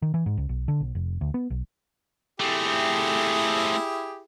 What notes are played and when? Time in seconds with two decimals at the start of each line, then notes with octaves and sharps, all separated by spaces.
0.02 D#3
0.14 E3
0.26 G#2
0.37 C#2
0.49 B1
0.68 D3
0.80 B1
0.95 F1
1.21 D2
1.34 B3
1.50 B1
2.40 A3 C4 E4 G4 G#4